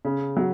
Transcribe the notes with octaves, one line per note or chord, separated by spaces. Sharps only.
C#3
F#3